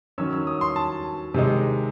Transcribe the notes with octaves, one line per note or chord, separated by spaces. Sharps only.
D#3 F#3 C#4 E6
E6
D#6
C6
A5
C3 D#3 G#3 D#4